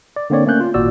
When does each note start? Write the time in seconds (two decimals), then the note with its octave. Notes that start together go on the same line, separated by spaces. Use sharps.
0.16 D5
0.30 D3 A#3 C4 C#5 D5
0.46 A3 A#3 C#4 F#6 G6
0.60 F4
0.74 G#1 A#2 F#4 D5 E6